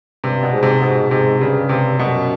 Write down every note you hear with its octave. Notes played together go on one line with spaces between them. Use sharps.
G2 C3
B2
G#2
C3
G#2 B2
G#2 C3
G2 C#3
C3
F#2 B2